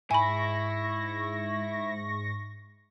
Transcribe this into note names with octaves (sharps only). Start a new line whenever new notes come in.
G#2 E4 G#5 B5 C#6 A#6